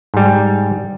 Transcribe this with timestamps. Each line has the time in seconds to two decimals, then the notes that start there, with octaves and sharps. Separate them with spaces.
0.14 G#2 G3